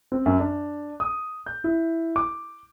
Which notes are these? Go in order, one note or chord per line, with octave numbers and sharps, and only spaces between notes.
C4
F#2
D4
D#6
G6
E4
D6